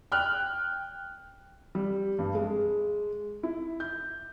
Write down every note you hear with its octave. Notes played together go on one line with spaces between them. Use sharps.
G5 F6 F#6
G3
G2
G#3
E4
G6